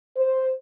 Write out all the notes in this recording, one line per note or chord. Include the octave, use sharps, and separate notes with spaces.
C5